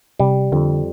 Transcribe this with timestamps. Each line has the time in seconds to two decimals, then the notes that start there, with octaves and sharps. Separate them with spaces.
0.20 C3 G3
0.52 F2 D3